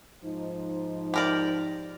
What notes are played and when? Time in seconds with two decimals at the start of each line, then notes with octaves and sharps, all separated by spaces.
0.24 G#2 F3 D#4
1.14 G4 A#4 D5